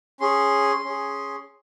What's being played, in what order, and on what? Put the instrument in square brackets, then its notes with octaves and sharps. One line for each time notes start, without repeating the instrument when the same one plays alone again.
[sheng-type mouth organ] C#4 G#4 C6
C#4 G#4